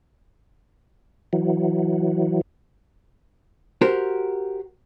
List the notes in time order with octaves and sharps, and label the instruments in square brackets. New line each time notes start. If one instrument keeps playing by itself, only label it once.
[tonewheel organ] E3 F#3
[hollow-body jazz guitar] F#4 G4 A#4 C5